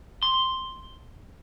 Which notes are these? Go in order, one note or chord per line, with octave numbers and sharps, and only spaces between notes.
C6